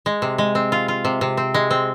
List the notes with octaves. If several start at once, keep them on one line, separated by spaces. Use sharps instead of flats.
G#3
C3
G#3
C4
F4
F4
C3
C3
C4
G#3
C4